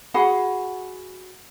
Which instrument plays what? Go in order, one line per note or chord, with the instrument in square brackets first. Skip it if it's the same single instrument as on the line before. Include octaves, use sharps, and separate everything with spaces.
[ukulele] F#4 G#4 F#5 B5